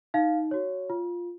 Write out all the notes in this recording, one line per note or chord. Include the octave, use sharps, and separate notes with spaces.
D#4 F5
F#4 C#5
F4